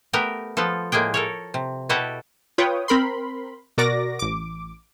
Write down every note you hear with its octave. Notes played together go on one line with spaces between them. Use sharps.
A3 B3 G4 A#4 G5
F3 B3 F4 A4
A2 G#3 A#3 G#4 G5
A4 A#4 C#5
C3
B2 E4 F#4 G4 A4 F#5
F4 B4 C#5 G5 D#6
C4 A#4 B5 C6
B2 F#4 A#4 D5 D6 A#6
A1 D6